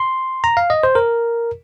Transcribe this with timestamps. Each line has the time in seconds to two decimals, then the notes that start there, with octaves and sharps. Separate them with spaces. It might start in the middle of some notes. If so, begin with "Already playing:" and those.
Already playing: C6
0.44 A#5
0.57 F5
0.70 D#5
0.83 C5
0.95 A#4